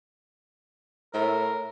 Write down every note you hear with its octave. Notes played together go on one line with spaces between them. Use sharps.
A2 A#4